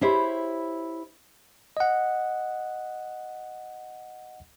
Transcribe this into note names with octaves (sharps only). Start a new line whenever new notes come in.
E4 G4 C5 C#5 E5
D#5 F#5